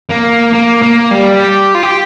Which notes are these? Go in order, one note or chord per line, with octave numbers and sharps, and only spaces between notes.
A#3
A#3
A#3
G3
G4
F4
G4